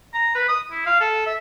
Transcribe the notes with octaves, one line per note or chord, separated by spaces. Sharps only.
A#5
B4
D#6
E4
F5
A4
E5